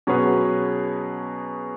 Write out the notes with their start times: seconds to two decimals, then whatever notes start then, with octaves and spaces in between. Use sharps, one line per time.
0.07 B2 F#3 C#4 G#4 B4